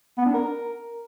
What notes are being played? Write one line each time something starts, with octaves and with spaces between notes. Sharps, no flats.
B3
D4
A#4